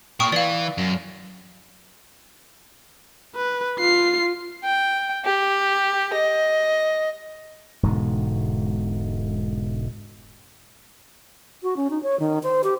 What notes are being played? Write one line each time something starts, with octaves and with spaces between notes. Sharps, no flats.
A#2 G5 C#6 D#6
E3 D5 F5
F#2
B4
F4 C7
G5
G4
D#5
E1 G#2 B2 D3
F#4
C#4
D#4
C#5
D#3
C5
G4